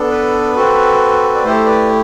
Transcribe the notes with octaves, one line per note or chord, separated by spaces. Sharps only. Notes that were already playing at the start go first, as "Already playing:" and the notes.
Already playing: B3 D4 A4
B4
C4 F#4 A4
D5
A3 E4 G4 A4 C5
B4 D5